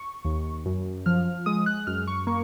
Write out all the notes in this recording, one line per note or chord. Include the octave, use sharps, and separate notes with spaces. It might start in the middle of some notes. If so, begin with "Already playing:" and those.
Already playing: C#6
D#2
F#2
F3 F6
G#3 D#6
F#6
F#2 F6
C#6
A#3 C#6